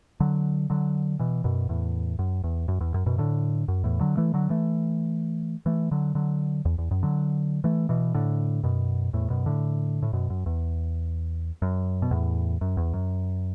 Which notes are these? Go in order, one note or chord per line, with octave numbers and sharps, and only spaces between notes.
D3 F#3
D3 F#3
B2 E3
F#2 B2
E2 A2
F#2
E2
F#2
E2
F#2
F#2 B2
A2 D3
F#2
E2 A2
D3 F#3
E3 A3
D3 F#3
E3 A3
E3 A3
D3 F#3
D3 F#3
E2
E2
F#2
D3 F#3
E3 A3
B2 E3
A2 D3
F#2 B2
E2 A2
F#2 B2
A2 D3
A2
F#2 B2
F#2
E2
F#2
B2
E2 A2
F#2
E2
F#2